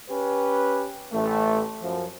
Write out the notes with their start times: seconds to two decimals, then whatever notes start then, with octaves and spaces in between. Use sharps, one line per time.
0.10 C#4 G4 B4
1.13 A1 A3
1.83 F#2 F3